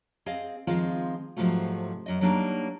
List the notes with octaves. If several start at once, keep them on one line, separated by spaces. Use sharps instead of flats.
C4 G#4 D#5 F5
D#3 F3 G#3 C4 F4
G#2 C3 F3 F#3 A3
F#2 D#5
F#3 G3 A#3 D4 D#4